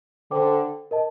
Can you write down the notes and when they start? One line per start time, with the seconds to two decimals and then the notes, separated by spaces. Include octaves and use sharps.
0.31 D3 C5 G5 D6
0.91 A#4 D#5 A5